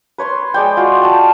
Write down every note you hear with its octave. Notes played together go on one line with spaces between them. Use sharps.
B4 C#5 C6 C#6
G#3 D5 G5
F4 F#4
G5 A5